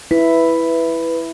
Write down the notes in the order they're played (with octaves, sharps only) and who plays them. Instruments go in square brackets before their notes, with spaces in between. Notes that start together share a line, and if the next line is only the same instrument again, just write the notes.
[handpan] E4 [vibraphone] B4